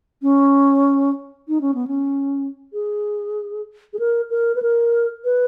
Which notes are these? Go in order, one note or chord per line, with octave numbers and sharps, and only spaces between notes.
C#4
D#4
C#4
B3
C#4
G#4
G#4
A#4
A#4
B4
A#4
B4